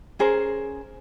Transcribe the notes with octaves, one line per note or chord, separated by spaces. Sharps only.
C#4 G#4 A#4 C5